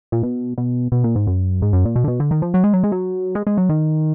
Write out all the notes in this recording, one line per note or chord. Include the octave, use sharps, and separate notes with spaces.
A#2
B2
B2
B2
A#2
G#2
F#2
G#2
F#2
A#2
B2
D3
B2
D3
D#3
F3
F#3
G#3
F#3
G#3
F#3
G#3
G#3
F#3
D#3